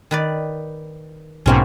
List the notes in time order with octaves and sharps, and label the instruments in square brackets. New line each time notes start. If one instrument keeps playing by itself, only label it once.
[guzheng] D#3 B4 D5
[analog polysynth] B1 G#2 B2 [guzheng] A#3 C4 C#4